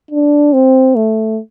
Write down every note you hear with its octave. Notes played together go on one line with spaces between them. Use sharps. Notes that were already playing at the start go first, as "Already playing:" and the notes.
D4
C4
A3